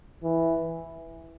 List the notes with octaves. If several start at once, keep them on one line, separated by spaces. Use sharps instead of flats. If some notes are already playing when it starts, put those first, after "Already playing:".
E3